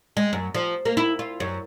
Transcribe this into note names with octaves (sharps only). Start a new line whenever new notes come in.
G#3
F#2
F3
A#3
E4
F4
F#2